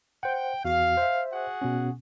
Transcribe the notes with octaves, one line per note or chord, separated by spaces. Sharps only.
C5 F#5 G5
E2 F#4 F5
C5 E5
F#4 G#4 F#5
B2 B3 C#4